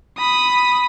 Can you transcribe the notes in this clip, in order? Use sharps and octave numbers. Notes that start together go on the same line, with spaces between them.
B5 D#6